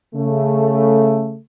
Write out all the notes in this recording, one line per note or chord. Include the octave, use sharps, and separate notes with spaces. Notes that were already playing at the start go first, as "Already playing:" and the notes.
C#3 A3